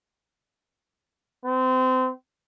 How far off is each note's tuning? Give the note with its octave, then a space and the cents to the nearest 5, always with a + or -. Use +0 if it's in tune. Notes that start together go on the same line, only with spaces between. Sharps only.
C4 -25